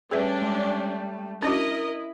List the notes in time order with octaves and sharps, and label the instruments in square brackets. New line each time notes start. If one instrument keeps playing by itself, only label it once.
[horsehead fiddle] G3 A3 [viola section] C#4 D4 [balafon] G#4 B4 E5
[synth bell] G#3
[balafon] C#4 D4 F#4 [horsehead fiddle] E4 [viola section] A#4 D#5